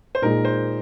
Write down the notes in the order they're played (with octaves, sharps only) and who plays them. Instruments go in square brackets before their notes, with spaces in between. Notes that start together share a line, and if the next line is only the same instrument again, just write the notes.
[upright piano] C5
[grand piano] A#2 G#3 D#4 G#4 [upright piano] A#4
[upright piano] C5